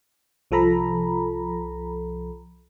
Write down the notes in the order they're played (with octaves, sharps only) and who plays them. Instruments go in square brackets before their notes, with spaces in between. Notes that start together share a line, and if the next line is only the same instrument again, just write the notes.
[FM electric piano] C2 F3 A4 A#5 B5